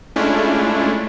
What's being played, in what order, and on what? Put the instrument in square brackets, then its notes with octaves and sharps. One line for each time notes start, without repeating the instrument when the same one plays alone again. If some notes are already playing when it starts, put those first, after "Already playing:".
[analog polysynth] G#3 A3 C#4 D4 E4 F4